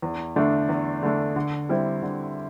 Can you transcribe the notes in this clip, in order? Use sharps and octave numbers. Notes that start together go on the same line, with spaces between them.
E2
D3 A3 D4
E2
D3 A3 D4
D3
G3 C4 E4
D3